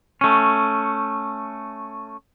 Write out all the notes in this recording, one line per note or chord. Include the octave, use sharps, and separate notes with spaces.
A3 C#4